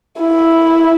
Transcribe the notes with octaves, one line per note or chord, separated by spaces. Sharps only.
E4